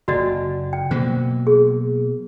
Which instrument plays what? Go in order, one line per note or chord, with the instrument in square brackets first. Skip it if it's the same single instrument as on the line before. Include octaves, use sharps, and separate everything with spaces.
[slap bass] F#1 [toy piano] F#4 D5 D#5
[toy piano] G5
[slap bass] B2 F#3 A#3 [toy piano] C5
[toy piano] G#4